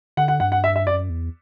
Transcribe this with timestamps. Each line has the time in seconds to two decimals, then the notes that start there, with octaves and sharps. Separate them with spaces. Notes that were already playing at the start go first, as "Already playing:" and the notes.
0.17 D3 F#5
0.28 F#5
0.40 G2 F#5
0.52 F#5
0.64 E5
0.76 E5
0.86 F#2 D5
1.10 E2